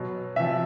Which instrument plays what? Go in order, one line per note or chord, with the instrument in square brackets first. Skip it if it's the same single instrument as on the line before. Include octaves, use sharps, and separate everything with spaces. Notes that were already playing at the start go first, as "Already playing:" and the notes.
Already playing: [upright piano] B2 F#3
C3 F3 E5